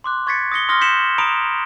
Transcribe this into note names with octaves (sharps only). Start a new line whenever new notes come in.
C6 D6 F#6
C#6 G#6 A6 B6 C#7
D#6 A#6 C#7 G7
C6 D#6 F6 A#6 G7
G6 B6 C#7 E7 F#7
A#5 B5 D#6 D7 F7